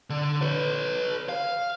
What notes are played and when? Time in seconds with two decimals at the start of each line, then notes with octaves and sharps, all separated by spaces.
0.10 D3
0.41 B4 C#5
1.29 F5